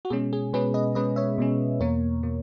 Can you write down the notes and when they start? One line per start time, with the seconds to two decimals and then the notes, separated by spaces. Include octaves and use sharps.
0.05 F#4
0.10 B2 G#3 C#4 G#4
0.33 G#4
0.53 B2 G#3 C#4 G#4 B4
0.74 B4 D#5
0.95 B2 G#3 C#4 B4 D#5
1.16 C#5 E5
1.38 B2 G#3 C#4
1.80 E2 B2 A#3 A#4 C#5
2.23 B2 A#3